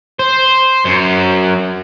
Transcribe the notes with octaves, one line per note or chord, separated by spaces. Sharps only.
C5
F#2